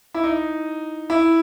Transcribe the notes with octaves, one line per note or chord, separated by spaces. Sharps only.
E4
D#4
E4